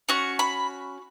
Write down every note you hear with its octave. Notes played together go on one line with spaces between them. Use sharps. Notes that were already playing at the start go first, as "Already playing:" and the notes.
C#4 F#4 C#6
B5